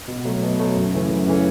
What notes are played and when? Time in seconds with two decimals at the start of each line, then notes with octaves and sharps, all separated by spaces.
0.08 B2
0.25 F#3 A3
0.42 B2
0.60 F#3 A3
0.76 F#2
0.93 C#3 E3 A3 C#4
1.10 F#2
1.27 C#3 E3 A3 C#4